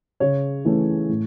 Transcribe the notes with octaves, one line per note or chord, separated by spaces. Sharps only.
C#3 C#5
E3 A3 C#4
A2